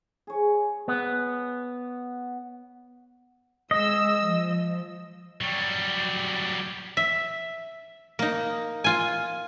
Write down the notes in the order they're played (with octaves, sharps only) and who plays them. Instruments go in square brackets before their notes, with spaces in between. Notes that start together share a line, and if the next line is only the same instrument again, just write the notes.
[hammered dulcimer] G#4 C#5
[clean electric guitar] B3
[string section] G#3 E6 [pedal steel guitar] D#5
[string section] F3
[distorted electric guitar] F#3 G3
[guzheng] E5
A#3 D#4
F4 G#5